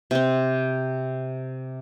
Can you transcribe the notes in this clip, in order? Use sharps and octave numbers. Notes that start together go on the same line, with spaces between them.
C3 C4